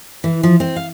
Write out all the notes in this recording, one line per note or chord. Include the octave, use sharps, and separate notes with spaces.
E3
F3
C4
F5